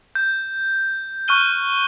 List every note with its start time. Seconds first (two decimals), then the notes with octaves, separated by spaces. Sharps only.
0.15 G6
1.28 C#6 F6 F#6 D#7 G7